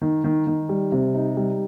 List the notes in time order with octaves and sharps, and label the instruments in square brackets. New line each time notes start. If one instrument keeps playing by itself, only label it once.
[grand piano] D#3
D#3
D#3
G3
C3
D#4
G3